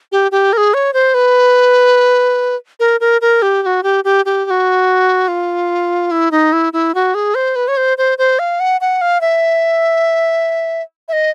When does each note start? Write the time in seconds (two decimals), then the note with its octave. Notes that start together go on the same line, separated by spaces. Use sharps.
0.12 G4
0.32 G4
0.53 A#4
0.57 G#4
0.74 C#5
0.94 C5
1.14 B4
2.80 A#4
3.01 A#4
3.21 A#4
3.42 G4
3.62 G4
3.66 F#4
3.83 G4
4.04 G4
4.26 G4
4.45 G4
4.50 F#4
5.28 F4
6.11 E4
6.31 D#4
6.53 E4
6.73 E4
6.95 F#4
7.15 G#4
7.35 C5
7.56 B4
7.68 C#5
7.77 C5
7.98 C5
8.18 C5
8.39 F5
8.60 F#5
8.81 F#5
9.01 F5
9.21 E5
11.08 E5
11.13 D#5